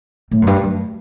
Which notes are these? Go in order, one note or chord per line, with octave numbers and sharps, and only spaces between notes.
A2
F#2
G2
F#2